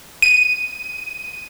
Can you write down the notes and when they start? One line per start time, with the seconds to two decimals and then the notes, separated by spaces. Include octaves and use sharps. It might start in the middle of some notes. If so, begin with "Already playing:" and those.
0.22 D#7